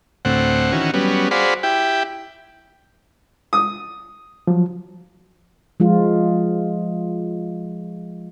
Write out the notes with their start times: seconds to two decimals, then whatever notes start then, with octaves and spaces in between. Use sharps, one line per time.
0.25 D2 A2 C4 F#5
0.72 D#3 E3 C#4 F#4
0.94 F#3 G3 B3 C#4
1.31 F#4 G#4 C5 D5 F5 B5
1.63 E4 G4 G5
3.53 D#6
4.47 F3 F#3
5.80 F3 G#3 F4